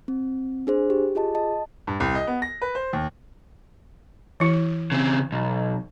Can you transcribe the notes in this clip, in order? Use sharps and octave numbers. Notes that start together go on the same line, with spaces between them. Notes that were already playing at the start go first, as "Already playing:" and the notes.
C4
D4 G#4 C5
G4
F4 G#4 D#5 A5
D#5 A5
G2
C2
D#5
B3
A#6
B4
C5
D#2
E3 E4
C#3 C4
B1